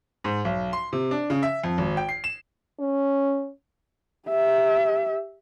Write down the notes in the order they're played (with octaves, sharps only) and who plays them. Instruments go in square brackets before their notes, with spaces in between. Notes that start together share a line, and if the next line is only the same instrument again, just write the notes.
[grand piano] G#2
B1
C6
C3
D4
C#3
E5
F2
G#1
G5
C7
E7
[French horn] C#4
[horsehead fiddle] G4 E5